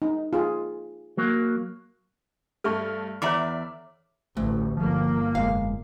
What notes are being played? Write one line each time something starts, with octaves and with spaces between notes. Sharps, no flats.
D#4
F4 G#4
F#3 A#3
G2 A3 A4 E5 C#6 F6
E2 C#5 D5 E5 A#5 D6
A1 D2 A3
G1 F3 A#3
F1 G#2 G#3 F5